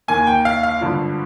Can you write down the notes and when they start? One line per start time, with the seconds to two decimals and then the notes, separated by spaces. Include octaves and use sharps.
0.08 D#2 D#3 A#3 G#5
0.27 G5
0.45 F5
0.63 F5
0.81 G#1 G2 D3 F3